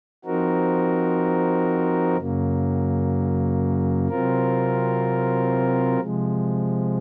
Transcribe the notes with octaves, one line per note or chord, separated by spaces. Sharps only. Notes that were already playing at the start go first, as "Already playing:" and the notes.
F3 C4 D#4 F#4 A#4
F#2 C#3 F#3 A#3
C3 F#3 C4 F4 A#4
C3 F3 G#3